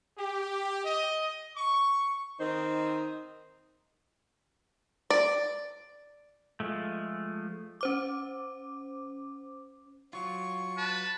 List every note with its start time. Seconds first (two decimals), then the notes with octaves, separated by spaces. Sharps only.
0.17 G4
0.84 D#5
1.55 C#6
2.39 D#3 C4 D#4 C5
5.10 D5
6.60 F3 G#3 A3
7.81 C#4 C5 D6
10.13 F#3 F4 C#6
10.77 B4 A5